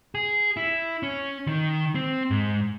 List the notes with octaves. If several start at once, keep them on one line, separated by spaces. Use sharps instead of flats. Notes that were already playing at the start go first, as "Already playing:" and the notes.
G#4
E4
C#4
D#3
C4
G#2